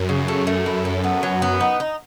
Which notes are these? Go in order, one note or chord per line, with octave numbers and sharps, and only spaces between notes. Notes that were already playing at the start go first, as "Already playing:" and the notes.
Already playing: F#2
C#3
A3
A3
E4
A4
B3
F#3
B3
D#4
D#4